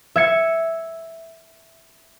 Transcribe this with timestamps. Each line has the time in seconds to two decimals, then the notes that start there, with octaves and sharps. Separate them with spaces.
0.16 E5 G#6 C#7